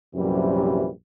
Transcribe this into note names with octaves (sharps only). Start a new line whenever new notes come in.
A#1 F#2 C3 E3 F#3 G3